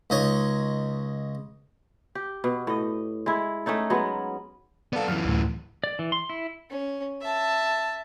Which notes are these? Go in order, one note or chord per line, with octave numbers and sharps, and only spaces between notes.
C#2 D#4 C#5
G4
B2
A2 D#5
G#3 E4
A3 C#4 D#4 A4
F#3 G#3 B3
B3 A4 D5 F5
F#2 E3 F6
D2 A2
D5
E3
C6
E4
C#4
E5 A5